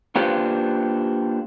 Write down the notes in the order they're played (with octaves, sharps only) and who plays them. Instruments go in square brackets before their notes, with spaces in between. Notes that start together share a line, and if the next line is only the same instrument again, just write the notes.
[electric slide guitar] A#3 D4 F4 G4 B4 C5